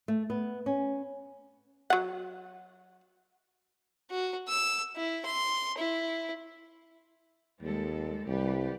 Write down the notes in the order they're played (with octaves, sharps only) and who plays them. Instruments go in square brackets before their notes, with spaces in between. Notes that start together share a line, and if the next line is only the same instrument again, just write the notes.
[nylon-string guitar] A3
B3
C#4
[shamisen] F#3 F#5
[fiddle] F#4
E6
E4
C6
E4
[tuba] D#2 [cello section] G3 G#3 A4
[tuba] C2 [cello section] G3 G4 B4